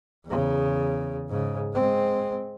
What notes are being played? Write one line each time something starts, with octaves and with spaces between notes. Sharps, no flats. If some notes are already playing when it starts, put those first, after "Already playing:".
E2 C#3
G#2 C#3
G#3 C4